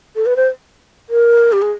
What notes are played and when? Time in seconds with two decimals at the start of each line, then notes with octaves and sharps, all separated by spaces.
0.16 A4
0.26 B4
0.36 C5
1.10 A#4
1.52 G4
1.62 G#4